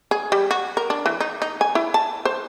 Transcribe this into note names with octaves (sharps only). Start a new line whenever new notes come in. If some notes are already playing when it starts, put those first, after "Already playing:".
G#4
G3
F#4
A#4
D4
E3
D#4
D#4
G#5
E4
A5
C5